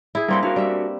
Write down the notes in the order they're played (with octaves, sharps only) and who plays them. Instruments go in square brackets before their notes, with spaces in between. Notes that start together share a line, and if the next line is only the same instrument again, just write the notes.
[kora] E4 G#4
[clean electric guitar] G2 G3 C6 [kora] A#3 C4 B4
[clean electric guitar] D4 F#4 A#4 [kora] F5
[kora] G3 E5